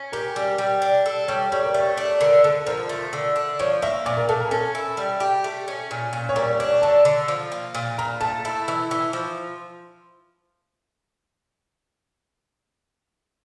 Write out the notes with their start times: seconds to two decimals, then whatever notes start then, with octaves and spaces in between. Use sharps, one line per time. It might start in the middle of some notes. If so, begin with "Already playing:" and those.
Already playing: C#4
0.12 G4 A#4
0.36 G3
0.58 G3
0.82 D4
1.06 A4
1.28 G3 C#5
1.52 G3 C#5
1.65 A#4
1.74 A3 C#5
1.97 D4
2.20 D3 A#4
2.44 D3 A4
2.66 F3 A#4
2.89 A3
3.13 D3
3.36 D4
3.59 F3 C#5
3.82 A#3 E5
4.06 A#2 D5
4.17 A#4
4.29 A#2 A4
4.40 A#4
4.51 C#4 A4
4.75 E4
4.97 G3
5.20 G4
5.44 A3
5.68 C#4
5.91 A#2
6.13 A#2
6.29 C#5
6.36 G3 A#4
6.59 D4 C#5
6.82 D3 A5
7.05 D3
7.28 F3
7.52 A#3
7.74 A#2
7.98 A#2 A#5
8.21 A3 A5
8.45 E4
8.68 E3
8.91 E3
9.13 F3